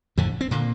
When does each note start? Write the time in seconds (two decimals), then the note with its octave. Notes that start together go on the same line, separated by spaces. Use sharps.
0.17 F2 A2 D3 A3
0.41 C4
0.51 A#2 D3 A#3